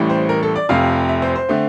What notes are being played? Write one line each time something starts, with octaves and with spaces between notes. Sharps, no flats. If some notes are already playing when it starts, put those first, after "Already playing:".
Already playing: A1 A2 E3 G3
C5
A#4
A4
D5
F1 F2 C3 F5
E5
C5
C5
D3 A3 C4